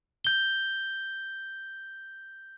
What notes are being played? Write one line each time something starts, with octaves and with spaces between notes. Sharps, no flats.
G6 G7